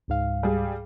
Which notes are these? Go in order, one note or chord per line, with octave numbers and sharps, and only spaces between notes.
C#2 G#2 F5
G3 G#4